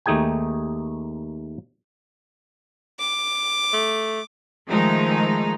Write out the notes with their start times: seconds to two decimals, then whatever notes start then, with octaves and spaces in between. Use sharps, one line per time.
0.06 D#2 A3 D#4 G#4 G5 G#5
3.00 D6
3.73 A3
4.67 D#3 F3 G#3 A3 D#4